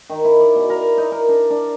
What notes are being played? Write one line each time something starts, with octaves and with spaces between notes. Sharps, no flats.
D#3
E4
D5
B2
A#4
D#4
A#4
D4
D4